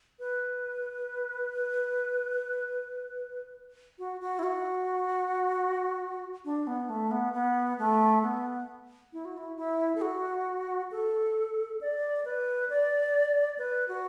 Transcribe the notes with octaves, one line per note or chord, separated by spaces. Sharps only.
B4
F#4
F#4
E4
F#4
D4
B3
A3
B3
B3
A3
B3
E4
F#4
E4
E4
A4
F#4
A4
D5
B4
D5
B4
F#4